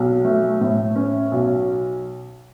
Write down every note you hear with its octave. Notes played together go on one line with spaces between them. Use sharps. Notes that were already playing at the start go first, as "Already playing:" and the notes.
Already playing: B1
A3
A2
C#4
B1